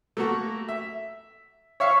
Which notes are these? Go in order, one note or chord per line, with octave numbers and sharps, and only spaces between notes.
A3 A#3 F#4
E5
C#5 E5 F5 C#6